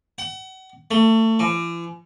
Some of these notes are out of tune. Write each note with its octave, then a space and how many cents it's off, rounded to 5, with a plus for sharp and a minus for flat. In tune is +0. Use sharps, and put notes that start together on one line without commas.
F#5 +35
A3 +25
E3 +45